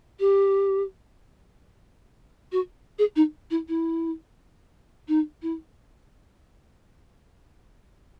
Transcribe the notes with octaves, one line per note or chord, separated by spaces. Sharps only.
G4
F#4
G#4
D#4
E4
E4
D#4
E4